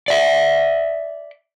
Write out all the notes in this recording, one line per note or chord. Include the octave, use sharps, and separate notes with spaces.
D5 E5